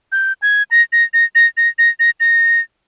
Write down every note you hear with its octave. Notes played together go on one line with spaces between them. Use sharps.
G6
G#6
A#6
A#6
A#6
A#6
A#6
A#6
A#6
A#6